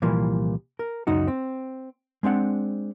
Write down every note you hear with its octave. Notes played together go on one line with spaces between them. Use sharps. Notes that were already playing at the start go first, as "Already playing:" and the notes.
C2 A#2 E3 F3 G3 A#3
A#4
C#2 F#2 D#4 F#4
C4
G#3 C4 D4 F#5